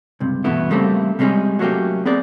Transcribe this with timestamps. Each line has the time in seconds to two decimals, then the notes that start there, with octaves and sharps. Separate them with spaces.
0.20 C#2 G2 C3
0.44 E2 G2 B2 A3 B3 E4
0.70 C#3 G3 A3 A#3 C4
1.19 C3 G3 G#3 C#4 G#4
1.59 F#3 A3 A#3 C#4 G4
2.05 B3 C4 G#4 A#4 D5